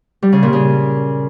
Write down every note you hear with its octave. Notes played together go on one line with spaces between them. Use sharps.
G3
C#3
A#2
C#3